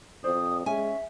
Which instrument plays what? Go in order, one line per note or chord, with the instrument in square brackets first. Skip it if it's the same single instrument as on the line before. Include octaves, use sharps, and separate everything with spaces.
[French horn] F2 [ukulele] C5 D5 [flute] D#6
[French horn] G#3 [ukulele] C#4 [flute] E5 [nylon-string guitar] G#5